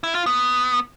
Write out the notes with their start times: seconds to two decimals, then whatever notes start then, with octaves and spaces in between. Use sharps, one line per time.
0.04 E4
0.15 F4
0.26 B3